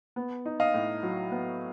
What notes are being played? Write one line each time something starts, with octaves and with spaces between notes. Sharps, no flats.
B3
D#4
D#5 F5
A2
F#3
B3